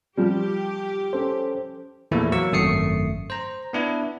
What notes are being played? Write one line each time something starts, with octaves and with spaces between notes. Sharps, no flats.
F3 G3 G4
C#4 A4 C5
E2 A#2 E3 F3 A3 E4
F#3 A#3 C#6 E6
G#1 F#2 A3 D#6 C7 C#7
C5 A#5
B3 D4 E4